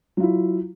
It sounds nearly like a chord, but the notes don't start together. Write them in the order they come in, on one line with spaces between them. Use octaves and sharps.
F#3 F4 E4